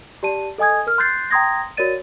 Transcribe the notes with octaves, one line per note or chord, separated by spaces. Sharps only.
G4 D5 A5 D#7
A4 D#5 G#5 D#6 G#6
A#4 F6
C6 F#6 G6 A6 C7
G5 A#5 C6 D#6 G#6 A#6
F#4 A#4 C#5 D5 A6 D#7